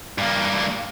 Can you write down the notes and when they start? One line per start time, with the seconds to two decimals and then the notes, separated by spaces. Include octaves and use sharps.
0.18 G2 A#3